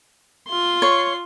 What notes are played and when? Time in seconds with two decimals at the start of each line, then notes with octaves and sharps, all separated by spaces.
0.48 F4 C6
0.82 C#5